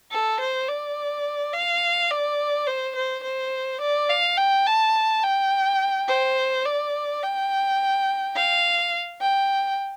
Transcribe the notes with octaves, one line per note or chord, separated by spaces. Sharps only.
A4
C5
D5
F5
D5
C5
C5
C5
D5
F5
G5
A5
G5
C5
D5
G5
F5
G5